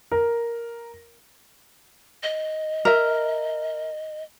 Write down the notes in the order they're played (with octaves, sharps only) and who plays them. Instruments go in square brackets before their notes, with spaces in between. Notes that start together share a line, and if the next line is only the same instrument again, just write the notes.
[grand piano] A#4
[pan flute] D#5
[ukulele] A#4 E5